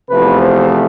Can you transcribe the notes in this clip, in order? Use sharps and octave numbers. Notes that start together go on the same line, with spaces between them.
E2 C3 F3 A3 B4
C5